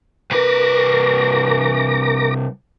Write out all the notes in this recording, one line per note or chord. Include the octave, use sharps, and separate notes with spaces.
C2 A#4 B4 D6 A#6